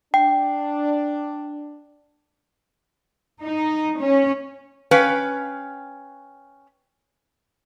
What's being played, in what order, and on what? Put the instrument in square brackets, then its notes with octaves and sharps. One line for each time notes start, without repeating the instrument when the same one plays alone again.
[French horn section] D4 [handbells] G5
[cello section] D#4
C#4
[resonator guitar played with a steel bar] C#4 B4 F5 G5